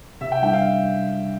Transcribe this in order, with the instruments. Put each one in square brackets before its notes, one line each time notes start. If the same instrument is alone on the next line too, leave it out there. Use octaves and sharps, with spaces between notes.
[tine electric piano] C3 [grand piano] E5
[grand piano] G5
[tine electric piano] G3 D4 [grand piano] G5
[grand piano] F5